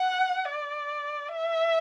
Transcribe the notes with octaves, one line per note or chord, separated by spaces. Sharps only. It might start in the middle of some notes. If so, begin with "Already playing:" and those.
Already playing: F#5
D5
E5